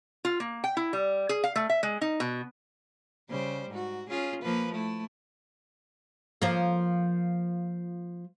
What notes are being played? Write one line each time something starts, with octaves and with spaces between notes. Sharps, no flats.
F4
A#3
G5
E4
G3
G#4
F5
A3
E5
G#3
D#4
B2
C#3 G3 C5
G#2 F#4
C#4 F4 G#4
F3 A#3 B4
A3 E4
F3 A#3